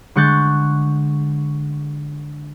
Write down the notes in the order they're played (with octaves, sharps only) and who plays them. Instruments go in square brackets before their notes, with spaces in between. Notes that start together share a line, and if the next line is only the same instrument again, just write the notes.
[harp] D3 G#3 C#6 F#6 G6 A6